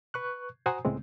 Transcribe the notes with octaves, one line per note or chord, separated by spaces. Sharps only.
B4 C#6 F#6
F#4 C5 F#5 G#5 A#5 D#6
C#2 A2 C#3 G#3 B3 C4